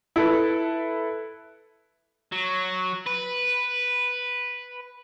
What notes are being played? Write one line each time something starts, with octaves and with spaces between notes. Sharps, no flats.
E4 A4 B4
F#3
B4